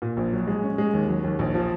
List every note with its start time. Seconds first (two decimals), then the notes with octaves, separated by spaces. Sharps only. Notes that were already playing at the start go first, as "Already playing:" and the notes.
0.02 A#2
0.17 A#1
0.32 F#3
0.47 G#3
0.63 C#4
0.78 G#3
0.93 D#2
1.08 F#3
1.24 D#2
1.39 A#1
1.55 F3